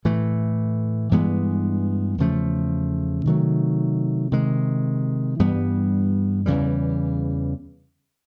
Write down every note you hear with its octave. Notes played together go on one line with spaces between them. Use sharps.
A2 E3 A3
G2 E3 G#3 B3
E2 C#3 F3 A3
C3 D#3 F#3 A3
C3 D#3 G#3
G2 E3 G3 B3
E2 C#3 E3 G3